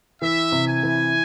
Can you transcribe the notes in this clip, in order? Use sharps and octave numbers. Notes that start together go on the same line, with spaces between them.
E3 E5
C3
G#5
E3